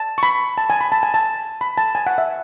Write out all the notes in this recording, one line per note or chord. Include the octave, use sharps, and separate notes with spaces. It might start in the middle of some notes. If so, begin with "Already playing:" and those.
Already playing: A5
C#6
B5
A5
G#5
B5
A5
G#5
A5
B5
A5
G#5
F#5
E5